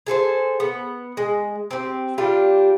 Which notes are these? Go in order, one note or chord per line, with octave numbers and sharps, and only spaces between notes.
G#4 A4 B4 C5
B3
G#3
C4 G4
G3 D4 F4 G4